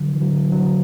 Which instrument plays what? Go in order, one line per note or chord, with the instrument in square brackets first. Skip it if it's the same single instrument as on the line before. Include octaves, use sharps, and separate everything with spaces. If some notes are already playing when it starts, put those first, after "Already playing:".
Already playing: [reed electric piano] D3 F#3
E3
D3 F#3
D3 F#3